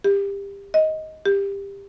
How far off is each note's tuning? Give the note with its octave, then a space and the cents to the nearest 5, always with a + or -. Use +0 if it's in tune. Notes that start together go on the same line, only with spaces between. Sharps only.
G4 +25
D#5 +10
G4 +20